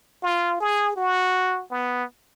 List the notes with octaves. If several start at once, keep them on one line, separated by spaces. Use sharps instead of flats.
F4
G#4
F#4
B3